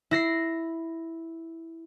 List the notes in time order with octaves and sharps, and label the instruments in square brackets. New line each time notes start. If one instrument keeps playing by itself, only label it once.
[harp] E4 A#6 C7